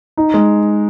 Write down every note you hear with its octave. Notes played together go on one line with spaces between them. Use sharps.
D#4
G#3